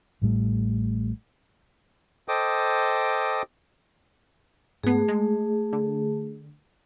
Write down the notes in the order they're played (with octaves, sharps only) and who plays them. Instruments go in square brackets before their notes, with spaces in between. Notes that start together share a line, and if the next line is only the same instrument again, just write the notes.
[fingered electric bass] A1 A2 G3 A3
[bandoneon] A4 C5 D#5 G5 D6 D#6
[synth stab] G#2 B3 [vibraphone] A3 G#4
[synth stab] G#3
D3